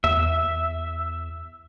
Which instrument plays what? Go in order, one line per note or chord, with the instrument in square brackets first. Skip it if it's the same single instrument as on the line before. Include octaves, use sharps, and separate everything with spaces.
[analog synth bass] E2 [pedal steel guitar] E5